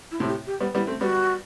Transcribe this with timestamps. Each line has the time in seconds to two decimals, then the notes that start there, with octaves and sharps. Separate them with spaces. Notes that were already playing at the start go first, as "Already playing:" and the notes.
0.11 E4
0.20 A2 C3
0.29 G4
0.47 G4
0.60 G3 B3
0.75 G3 B3 E4
0.87 A3 C4
1.01 G3 B3 F#4